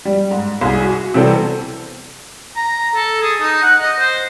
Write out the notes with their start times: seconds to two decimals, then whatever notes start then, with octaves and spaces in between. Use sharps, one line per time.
0.05 G3
0.31 G#2
0.61 C2 G#4
0.82 F#4
1.14 C3 E3 G3 B3 C4 A4
2.56 A#5
2.95 A4
3.22 G#4
3.42 D#4
3.63 F#5
3.82 D#5
3.99 C5